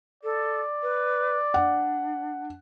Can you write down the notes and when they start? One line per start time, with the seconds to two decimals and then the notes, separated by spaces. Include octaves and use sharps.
0.23 A4 D5
0.82 B4
1.54 D4 F#5